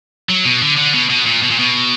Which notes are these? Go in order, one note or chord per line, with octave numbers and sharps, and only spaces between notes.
F#3
B2
D3
D3
B2
B2
A#2
B2
A#2
B2